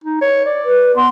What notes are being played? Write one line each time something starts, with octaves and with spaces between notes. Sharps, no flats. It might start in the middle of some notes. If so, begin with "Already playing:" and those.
D#4
C#5
D5
B4
B3 C6